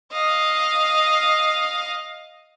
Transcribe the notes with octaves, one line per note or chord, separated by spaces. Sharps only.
D#5 F5